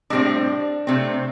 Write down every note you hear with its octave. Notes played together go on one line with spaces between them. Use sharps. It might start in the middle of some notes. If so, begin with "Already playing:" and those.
A2 G3 C4 D4
C3 A3 C4